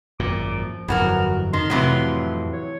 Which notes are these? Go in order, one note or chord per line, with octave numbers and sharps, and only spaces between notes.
G#1 F#2 A#2 D6
F3
G1 F2 E3 F#3 F#4 A#4
D#3 C6
F2 A2 C3 E3 F#3
C#5